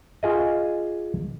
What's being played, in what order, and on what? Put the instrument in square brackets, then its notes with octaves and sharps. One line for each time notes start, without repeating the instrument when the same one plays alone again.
[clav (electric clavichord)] F4 G#4 D#5